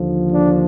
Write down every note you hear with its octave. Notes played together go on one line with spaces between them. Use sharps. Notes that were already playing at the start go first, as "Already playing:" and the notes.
Already playing: D#2 D3 F3
D4